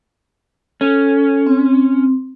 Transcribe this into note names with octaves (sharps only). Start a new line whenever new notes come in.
C#4 A4
C4